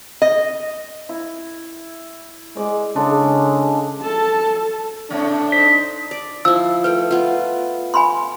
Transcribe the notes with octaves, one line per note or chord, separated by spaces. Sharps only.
D#5
E4
G#3 D5
C#3 G#3 D4 A4
A4 A5
A2 C3 A3 D4
D#4 C5 B6
D5
F3 E4 E6
A3 B4 G5
B3 F4
G#5 B5 C6